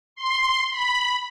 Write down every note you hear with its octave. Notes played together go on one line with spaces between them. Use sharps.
C6
B5